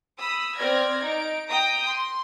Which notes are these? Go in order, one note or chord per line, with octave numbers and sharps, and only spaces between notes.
B5 D#6 E6
C4 D5 F6 G#6 A#6
D#4 D7
G5 A#5 D#6
C6